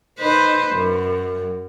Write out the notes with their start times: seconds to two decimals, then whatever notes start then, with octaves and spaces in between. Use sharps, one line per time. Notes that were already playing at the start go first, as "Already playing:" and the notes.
0.19 D#4 B4 C5
0.72 F#2